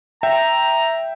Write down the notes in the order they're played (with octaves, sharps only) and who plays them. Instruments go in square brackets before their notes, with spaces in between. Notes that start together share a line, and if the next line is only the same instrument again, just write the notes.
[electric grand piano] E5 G5 [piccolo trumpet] A#5